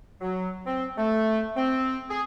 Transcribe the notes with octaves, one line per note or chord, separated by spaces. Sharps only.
F#3
C4
A3
C4
G#4